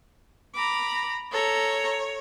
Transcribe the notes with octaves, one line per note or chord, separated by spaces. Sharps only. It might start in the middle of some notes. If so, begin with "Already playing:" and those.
A#5 B5 D6
A4 C#5 A#5